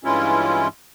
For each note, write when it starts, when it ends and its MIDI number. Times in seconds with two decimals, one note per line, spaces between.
0.04 0.68 43
0.04 0.68 52
0.04 0.68 56
0.04 0.68 61
0.04 0.68 64
0.04 0.68 65